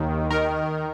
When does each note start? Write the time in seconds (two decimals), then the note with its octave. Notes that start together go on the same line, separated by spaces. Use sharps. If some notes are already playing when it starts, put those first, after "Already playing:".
Already playing: D#2 D#3
0.30 D#3 A#4